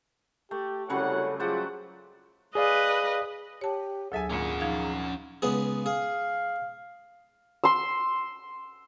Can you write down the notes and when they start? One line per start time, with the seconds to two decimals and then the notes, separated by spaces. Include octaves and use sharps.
0.51 A3 G4
0.90 C2 F#2 C#3 F#3 G3 A4 C#5 F#5
1.40 F#3 G3 A3 F4 G#4 C5 D5 F#5
2.55 G#4 B4 D5 D#5 F5
3.61 G4 C#5 A5
4.12 D2 F#3 G#4 A4 E5 G#5
4.30 G#1 A#2 C#4 F#5
4.61 F3 D#4 F5
5.42 C#2 B3 G#4
5.86 G#4 F5
7.64 C6 E6